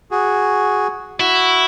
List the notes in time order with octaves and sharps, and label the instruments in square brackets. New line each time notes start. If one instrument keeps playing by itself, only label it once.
[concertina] F#4 G#4
[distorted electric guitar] E4 [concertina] F#4